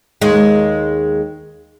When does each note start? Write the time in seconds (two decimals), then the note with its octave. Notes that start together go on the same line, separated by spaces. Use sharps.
0.21 D#2 G#3